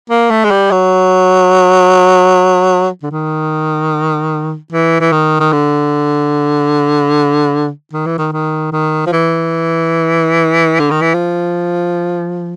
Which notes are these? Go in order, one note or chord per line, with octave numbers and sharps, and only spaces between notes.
A#3
A3
G#3
G3
F#3
D3
D#3
E3
E3
D#3
D#3
D3
D#3
E3
D#3
D#3
D#3
F3
E3
D3
D#3
E3
F3